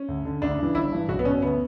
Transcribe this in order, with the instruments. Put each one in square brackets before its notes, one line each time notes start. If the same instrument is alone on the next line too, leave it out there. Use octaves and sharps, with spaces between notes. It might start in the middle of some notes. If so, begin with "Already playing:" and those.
Already playing: [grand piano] C#4
D2
D3
D2 D4
C#3 E3
G1 E4
G2 E3
B1 F#4
B3
B2 C#4
D2 B3